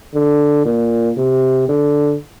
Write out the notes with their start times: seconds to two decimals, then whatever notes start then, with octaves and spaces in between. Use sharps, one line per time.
0.14 D3
0.65 A#2
1.17 C3
1.69 D3